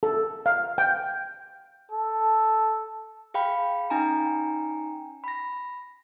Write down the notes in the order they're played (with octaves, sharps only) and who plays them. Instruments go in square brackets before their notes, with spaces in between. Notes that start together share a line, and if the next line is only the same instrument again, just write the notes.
[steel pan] A4
F5
G5
[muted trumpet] A4
[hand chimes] G#4 F5 G5 B5
C#4 D#4 G5 G#5 A#5
B5 A#6